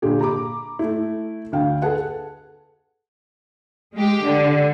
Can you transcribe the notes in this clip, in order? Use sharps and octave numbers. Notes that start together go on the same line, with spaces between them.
A#2 D3 G4 G#4
A#5 B5 D6
A3 E4
D2 D3 F5 G5
G#4 A4 B4 F#5 A5
G#3 G4
D3